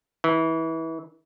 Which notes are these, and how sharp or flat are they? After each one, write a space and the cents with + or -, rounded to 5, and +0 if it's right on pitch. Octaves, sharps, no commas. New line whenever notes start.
E3 -25